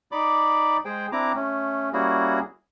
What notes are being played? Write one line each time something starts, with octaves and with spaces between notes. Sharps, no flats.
D#4 D5 B5 D6
G#3 G#4 C5 G5
C4 D4 E4 A#5 D6
A3 C#4
G3 A#3 C#4 E4 F#4 G#4